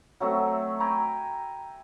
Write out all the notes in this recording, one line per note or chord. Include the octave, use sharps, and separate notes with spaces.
F#3 A3 C4 E5
G5 G#5 A#5 B5